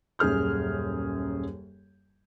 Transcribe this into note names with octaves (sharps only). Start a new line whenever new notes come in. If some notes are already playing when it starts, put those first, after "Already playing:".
D#1 F#2 G#4 F6 G6